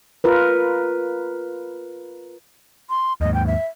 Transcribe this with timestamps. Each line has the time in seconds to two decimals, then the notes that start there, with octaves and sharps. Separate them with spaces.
0.24 F4 A#4 B4
2.90 C6
3.21 D#2 G#2 D#5
3.34 G5
3.47 E5